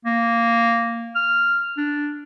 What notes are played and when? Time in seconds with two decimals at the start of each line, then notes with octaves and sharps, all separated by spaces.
0.05 A#3
1.16 F6
1.77 D4